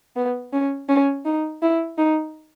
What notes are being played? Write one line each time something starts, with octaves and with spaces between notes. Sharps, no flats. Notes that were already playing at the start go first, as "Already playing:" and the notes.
B3
C#4
C#4
D#4
E4
D#4